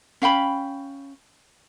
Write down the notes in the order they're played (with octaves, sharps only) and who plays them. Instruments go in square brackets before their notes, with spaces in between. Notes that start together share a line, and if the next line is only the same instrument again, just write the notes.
[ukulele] C#4 F5 G5 B5